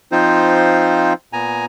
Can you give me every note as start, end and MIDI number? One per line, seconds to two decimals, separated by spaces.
0.12 1.13 53
0.12 1.13 60
0.12 1.13 63
0.12 1.13 65
0.12 1.13 72
1.33 1.66 46
1.33 1.66 59
1.33 1.66 80
1.33 1.66 82